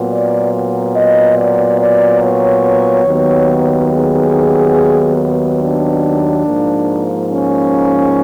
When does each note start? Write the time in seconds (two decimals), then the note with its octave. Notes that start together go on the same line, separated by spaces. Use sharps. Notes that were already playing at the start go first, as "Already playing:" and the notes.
Already playing: A#2 F#3 B3
0.09 D5
0.93 D#5
1.36 D5
1.78 D5
2.20 C#5
3.05 D#2 D#3 F#3 B3
3.90 G#4
5.59 D4
6.44 G#2 F3 A#3
7.29 C#4